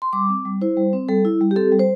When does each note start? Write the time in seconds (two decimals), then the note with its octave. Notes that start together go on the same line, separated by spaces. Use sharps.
0.02 C6
0.13 G3 D6
0.29 C4
0.45 G3
0.62 E4 C5
0.77 G3
0.93 C4
1.09 G3 A4
1.25 E4
1.41 G3
1.51 G4
1.56 C4 A4
1.72 G3
1.79 C5